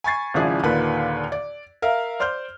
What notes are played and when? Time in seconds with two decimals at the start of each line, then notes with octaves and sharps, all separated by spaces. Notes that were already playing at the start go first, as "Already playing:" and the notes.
0.04 G#5 B5 C#6 G#6 A6 C7
0.34 G#1 C#3 F3 D4 E4 G#4
0.63 D#2 A#2 D3 D#3 B4
1.32 D5
1.82 A#4 E5 F5
2.20 C5 D5 C6 F6 G6